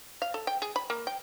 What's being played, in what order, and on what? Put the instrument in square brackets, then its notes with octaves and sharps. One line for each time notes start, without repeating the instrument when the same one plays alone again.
[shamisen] F5
A4
G5
G#4
B5
A#3
G5